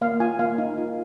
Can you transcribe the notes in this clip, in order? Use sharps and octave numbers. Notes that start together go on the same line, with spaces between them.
A#3 F5
F4 G#5
A#3 F5
D#4
F4